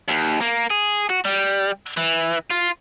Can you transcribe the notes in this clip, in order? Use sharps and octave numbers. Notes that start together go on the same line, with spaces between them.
D#2
A#3
G#4
F#4
G3
E3
F4